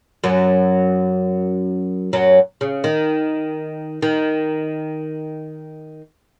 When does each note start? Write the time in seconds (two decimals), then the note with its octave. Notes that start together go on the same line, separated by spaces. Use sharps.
0.24 F#2 F#3
2.13 F#2 F#3
2.61 C#3
2.84 D#3
4.02 D#3